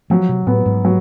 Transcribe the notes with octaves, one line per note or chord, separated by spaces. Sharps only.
F3 F#3
C3
A2 B3
G#2
F#3